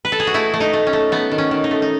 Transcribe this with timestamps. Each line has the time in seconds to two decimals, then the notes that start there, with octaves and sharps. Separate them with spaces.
0.05 B4
0.12 A4
0.20 G#4
0.27 F#4
0.34 A3 E4
0.54 A3
0.60 D#4
0.73 A3
0.87 C#4
0.93 A3
1.12 A3 B3
1.32 D#3
1.38 C#4
1.51 D#3
1.64 D#4
1.71 A3
1.82 D#4